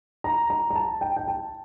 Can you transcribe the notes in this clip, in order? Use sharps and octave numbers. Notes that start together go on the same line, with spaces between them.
A#5
A#5
A#5
A5
G5
G5
A5